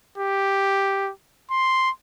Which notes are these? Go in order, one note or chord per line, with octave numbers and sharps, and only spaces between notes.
G4
C6